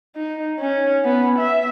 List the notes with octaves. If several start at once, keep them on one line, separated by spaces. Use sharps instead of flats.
D#4
C#4
B3
E5